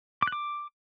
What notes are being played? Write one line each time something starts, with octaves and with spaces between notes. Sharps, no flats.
D6
F#6
D6